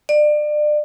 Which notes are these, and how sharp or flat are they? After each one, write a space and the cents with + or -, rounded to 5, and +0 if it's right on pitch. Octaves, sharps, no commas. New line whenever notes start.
D5 +30